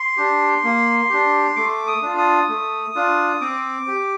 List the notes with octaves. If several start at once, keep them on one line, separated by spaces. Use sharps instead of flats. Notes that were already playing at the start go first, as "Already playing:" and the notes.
Already playing: C6
D4 G4
A#3
D4 G4
A3 D6
D#6
D4 F4
D#6
A3
D4 F4
C4 D6
G4